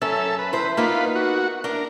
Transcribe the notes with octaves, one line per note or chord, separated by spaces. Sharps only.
F#2 C#4 A4 E5
B4
E2 C5
A#3 B3 D#4 F4 B4
F#4
D4 A#4